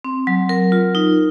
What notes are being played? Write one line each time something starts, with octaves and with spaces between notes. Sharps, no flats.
C4
F#3
A#4
F4
D#4